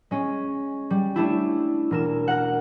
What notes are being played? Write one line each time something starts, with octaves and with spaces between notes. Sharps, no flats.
G#3 C#4
G3
A3 D4 E4 G4
E1 A#4 E7
A#4 F#5